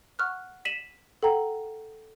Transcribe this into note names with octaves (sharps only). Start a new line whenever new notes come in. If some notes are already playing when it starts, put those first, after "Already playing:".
F#5 C#6 F6 F#6
B6 D#7 E7 F#7
A4 F#5 G5 A#5